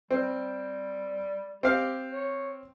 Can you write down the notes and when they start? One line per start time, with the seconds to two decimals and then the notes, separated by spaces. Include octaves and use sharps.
0.11 G3 C4
1.63 C4 G4 F5
2.11 C#5